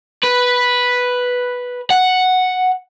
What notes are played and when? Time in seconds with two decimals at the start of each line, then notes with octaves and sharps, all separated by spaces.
0.24 B4
1.90 F#5